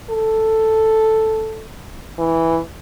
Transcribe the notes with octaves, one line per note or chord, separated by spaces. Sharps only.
A4
E3